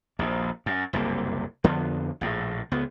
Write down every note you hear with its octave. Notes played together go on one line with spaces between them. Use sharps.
A#1 D#2
F#2
F#1 C2 G2 A#3
F2 D3 F3 B3
A#1 A2
C#2 B3